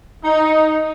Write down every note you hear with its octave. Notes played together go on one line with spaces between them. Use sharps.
D#4